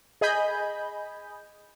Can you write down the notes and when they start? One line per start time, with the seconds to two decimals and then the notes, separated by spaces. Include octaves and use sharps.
0.21 G#4 D#5 G#5 B5 G6